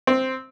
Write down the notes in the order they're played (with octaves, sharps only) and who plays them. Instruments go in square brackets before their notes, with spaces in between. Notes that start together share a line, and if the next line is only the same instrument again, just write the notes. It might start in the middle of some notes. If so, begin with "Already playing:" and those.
[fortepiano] C4